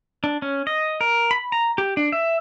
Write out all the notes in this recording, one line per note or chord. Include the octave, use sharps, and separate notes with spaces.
D4
C#4
D#5
A#4
B5
A#5
G4
D4
E5